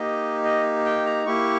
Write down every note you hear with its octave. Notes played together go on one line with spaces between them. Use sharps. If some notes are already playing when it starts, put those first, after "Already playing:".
Already playing: A#3 D#4 G4 D#5
D#5
G5
A#5
A#3 E4 G4 C#6